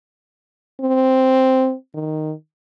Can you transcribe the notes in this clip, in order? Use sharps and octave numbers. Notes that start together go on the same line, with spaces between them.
C4
D#3